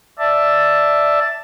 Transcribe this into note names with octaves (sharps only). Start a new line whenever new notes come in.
D5 E5 A5